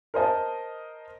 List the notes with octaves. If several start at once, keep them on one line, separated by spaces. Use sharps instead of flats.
A#4 C5 D#5 A5